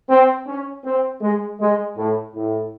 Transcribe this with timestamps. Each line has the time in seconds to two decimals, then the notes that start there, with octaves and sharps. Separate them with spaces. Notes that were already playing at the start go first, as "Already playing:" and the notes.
0.09 C4
0.46 C#4
0.84 C4
1.21 G#3
1.59 G#3
1.96 A2
2.34 A2